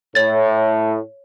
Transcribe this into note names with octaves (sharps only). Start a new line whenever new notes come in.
A2 C#5 A6